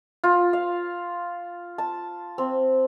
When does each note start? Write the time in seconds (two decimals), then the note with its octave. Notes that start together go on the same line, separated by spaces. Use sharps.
0.24 F4
0.53 F5
1.78 A5
2.38 C4